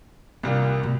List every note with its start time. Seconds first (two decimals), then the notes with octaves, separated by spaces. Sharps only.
0.43 C2 C3 G3 A#3 F4
0.83 B2 A3